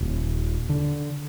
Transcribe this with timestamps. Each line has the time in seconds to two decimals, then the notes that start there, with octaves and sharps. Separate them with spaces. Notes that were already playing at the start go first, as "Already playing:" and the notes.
0.01 D#1
0.69 D3